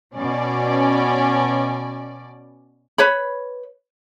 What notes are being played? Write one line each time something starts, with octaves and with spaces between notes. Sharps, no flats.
B2 C#4 D5
B4 C#5 B5